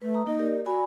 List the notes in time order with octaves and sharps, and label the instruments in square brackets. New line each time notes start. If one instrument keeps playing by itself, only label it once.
[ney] A3 [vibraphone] B4
[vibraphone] A#5 D#6
[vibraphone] A#3 D#4 [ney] D#5
[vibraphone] G4 A#4 D5
[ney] F#4 [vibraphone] D5 G#5 B5